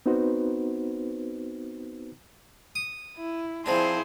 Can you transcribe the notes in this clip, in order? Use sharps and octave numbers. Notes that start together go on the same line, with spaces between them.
B3 C4 D#4 F#4 B4 C5
D#6
E4
F3 C4 D4 E4 G#4 C5